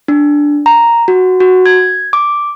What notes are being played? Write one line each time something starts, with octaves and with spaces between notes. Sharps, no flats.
D4
A#5
F#4
F#4
G#6
D6